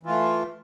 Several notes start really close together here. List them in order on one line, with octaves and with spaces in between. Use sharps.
E3 F4 A3